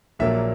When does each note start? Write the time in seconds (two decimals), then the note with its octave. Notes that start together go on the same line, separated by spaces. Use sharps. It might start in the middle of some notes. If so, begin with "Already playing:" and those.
0.19 A#1 A#2 F#3 A#3 E5